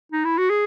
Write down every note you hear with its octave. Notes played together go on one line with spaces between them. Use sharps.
D#4
E4
F#4
G#4